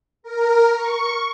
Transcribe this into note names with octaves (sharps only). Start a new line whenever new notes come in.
A#4
C#6